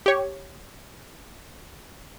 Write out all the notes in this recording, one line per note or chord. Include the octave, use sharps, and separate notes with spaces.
G4 C#5